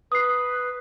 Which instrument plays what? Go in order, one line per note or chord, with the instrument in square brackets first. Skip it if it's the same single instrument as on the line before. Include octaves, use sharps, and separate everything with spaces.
[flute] B4 [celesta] D#6 C7